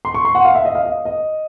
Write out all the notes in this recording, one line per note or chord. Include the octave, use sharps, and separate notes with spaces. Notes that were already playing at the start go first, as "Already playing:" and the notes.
C6
C#6
C6
F#5
F5
E5
D#5
F5
D#5
D#5